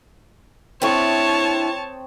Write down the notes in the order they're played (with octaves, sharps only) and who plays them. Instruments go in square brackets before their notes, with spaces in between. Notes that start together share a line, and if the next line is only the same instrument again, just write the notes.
[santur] C4 C#6 D#6 [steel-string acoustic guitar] D4 E4 [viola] C#5 A5